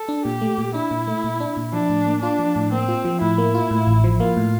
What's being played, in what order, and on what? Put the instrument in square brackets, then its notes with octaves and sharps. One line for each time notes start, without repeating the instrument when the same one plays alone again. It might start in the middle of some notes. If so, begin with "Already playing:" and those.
Already playing: [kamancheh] A4
[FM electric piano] D4
[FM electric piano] A#2 [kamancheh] G4
[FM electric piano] A3
A#2
[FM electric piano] D4 [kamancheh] E4
[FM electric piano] A#2
A3
A#2
D4
A#2
[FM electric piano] F3 [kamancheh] D4
[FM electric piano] A2
A#3
[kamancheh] D4 [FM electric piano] F4
[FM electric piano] F3
A2
[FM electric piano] A#3 [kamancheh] C4
[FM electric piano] F4
F3
[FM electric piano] A2 [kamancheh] E4
[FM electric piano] A#3
F4
A2
A1
F3
[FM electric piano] A#3 [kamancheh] F4
[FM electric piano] A2